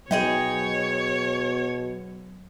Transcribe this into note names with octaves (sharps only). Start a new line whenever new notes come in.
B2 F#3 G#4 C#5 D#5 G5